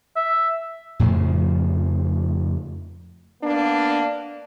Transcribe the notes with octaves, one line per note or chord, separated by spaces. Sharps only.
E5
F2 A2 C#3 F3
A#3 B3 D4